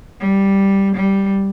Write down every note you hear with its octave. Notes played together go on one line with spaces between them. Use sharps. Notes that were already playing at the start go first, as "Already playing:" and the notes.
G3
G3